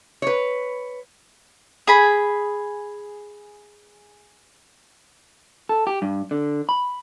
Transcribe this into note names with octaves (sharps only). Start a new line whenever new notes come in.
B4 C#5
G#4 B5
A4
G4
G2
D3
B5